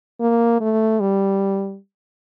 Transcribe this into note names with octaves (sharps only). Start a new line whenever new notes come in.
A#3
A3
G3